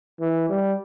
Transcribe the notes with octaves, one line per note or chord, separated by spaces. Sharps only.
E3
G3